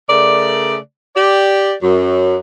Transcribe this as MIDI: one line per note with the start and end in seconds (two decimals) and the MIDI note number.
0.10 0.76 49
0.10 0.76 57
0.10 0.76 70
0.10 0.76 74
1.16 1.73 67
1.16 1.73 74
1.82 2.38 42